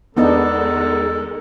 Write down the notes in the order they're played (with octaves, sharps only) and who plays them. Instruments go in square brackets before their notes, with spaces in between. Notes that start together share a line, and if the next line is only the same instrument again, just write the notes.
[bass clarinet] E2 [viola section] D3 D#3 G#3 [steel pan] B3 D4 D#4 [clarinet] A4